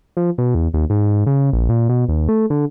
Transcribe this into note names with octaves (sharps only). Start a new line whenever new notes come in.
F3
B2
E2
D#2
G#2
C#3
A#1
A#2
B2
D#2
A3
D3